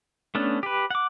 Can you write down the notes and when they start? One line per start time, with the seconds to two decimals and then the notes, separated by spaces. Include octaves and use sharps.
0.35 A3 B3 C#4 D4
0.63 G4 B4
0.90 F#5 D6